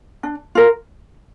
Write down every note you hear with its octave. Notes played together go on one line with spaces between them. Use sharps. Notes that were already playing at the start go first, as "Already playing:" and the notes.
D4
F4 A#4